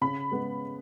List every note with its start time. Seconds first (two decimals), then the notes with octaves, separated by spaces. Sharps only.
0.01 C#3 B5
0.32 G#3 B3